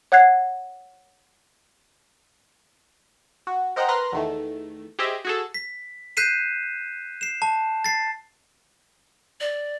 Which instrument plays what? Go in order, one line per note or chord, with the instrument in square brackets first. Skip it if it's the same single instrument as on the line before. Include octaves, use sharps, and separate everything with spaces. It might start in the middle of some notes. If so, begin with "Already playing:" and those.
[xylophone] C#5 F#5 F#6 G#6 C7
[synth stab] F#4
A#4 C5 D#5 F#5 G5 A#5
A#4 B4 C6 F6 F#6 A#6
E2 D#3 A3
G4 G#4 C5 D#5 E5
F#4 G#4 A4
[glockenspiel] B6
F#6 G6 B6 C7 D#7 E7
C7 E7
A5
A6 C7
[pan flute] D5